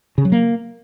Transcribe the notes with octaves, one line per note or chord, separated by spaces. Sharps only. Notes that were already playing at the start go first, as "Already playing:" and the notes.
C#3
F#3
A#3